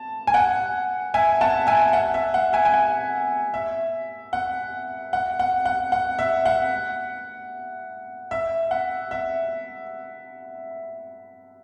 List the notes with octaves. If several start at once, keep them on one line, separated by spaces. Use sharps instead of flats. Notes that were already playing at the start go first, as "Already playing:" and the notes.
Already playing: A5
G#5
F#5
E5 G#5
F#5 A5
E5 G#5
F#5
E5
F#5
E5 G#5
G#5
F#5
E5
F#5
F#5
F#5
F#5
F#5
E5
F#5
E5
F#5
E5